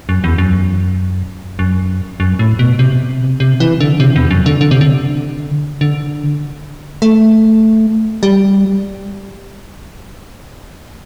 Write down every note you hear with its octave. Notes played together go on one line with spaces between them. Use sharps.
F#2
E2
F#2
F#2
F#2
A2
B2
C3
C3
E3
D3
C3
E2
F#2
D3
D3
C3
D3
D3
A3
G3